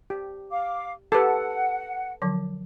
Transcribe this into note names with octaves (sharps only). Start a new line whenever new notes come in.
G4
F5 D6
G4 A4 B4 F#5 D6
D3 F3 F#3